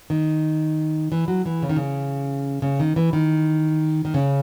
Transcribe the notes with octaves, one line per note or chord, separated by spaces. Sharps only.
D#3
E3
F#3
E3
C#3
D#3
C#3
C#3
D#3
E3
D#3
D#3
C#3